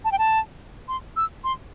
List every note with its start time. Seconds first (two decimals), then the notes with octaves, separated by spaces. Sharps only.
0.05 A5
0.12 G5
0.19 A5
0.88 C6
1.17 E6
1.44 C6